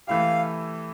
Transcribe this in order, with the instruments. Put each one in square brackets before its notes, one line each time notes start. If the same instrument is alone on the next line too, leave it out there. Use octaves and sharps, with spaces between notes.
[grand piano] E3 A3 E4 G4 [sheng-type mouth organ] F5